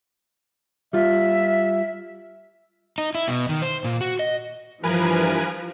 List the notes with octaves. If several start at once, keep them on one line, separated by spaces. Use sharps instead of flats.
G3 F4 E5
D#4
E4
B2
D#3
C5
A#2
F#4
D#5
G2 E3 F3 A#4 B4 G#5